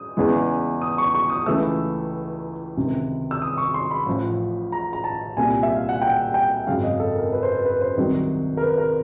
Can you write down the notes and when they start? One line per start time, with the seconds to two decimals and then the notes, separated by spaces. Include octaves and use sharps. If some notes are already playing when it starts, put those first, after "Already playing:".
Already playing: D#6
0.17 E2 C#3 E3 G#3
0.82 D#6
0.98 C#6
1.14 C#6
1.30 D#6
1.46 C#2 C#3 E3 A3 E6
2.77 C#2 C3 D#3
3.31 E6
3.42 D#6
3.58 C#6
3.74 C6
3.91 B5
4.06 A1 A2 F3
4.72 A#5
4.93 A#5
5.04 A5
5.37 C2 A#2 G3 G#5
5.63 E5
5.75 F5
5.89 F#5
6.02 G5
6.34 G5
6.67 G#1 F#2 C#3 F5
6.83 D#5
7.00 A4
7.15 A#4
7.32 B4
7.43 C5
7.49 B4
7.65 B4
7.81 C5
7.97 C2 C3 D#3 F#3
8.57 A#4
8.62 B4
8.78 A#4